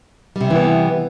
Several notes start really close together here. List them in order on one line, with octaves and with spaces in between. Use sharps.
G3 C3 C#4 E3 B3